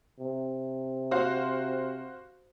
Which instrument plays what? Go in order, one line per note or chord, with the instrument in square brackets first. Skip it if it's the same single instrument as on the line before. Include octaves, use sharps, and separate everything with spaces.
[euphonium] C3
[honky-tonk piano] F#4 C5 F5